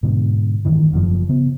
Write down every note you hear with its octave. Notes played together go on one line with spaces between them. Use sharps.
G#2 B2 D3
G2 D#3 E3
F#1 F#2 C#3 F3
C#3 B3